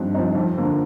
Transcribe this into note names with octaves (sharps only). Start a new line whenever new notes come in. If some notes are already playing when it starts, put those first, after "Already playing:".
Already playing: G2 F3 C4 D#4
F3 C4 D#4
F2
D3 F3 A#3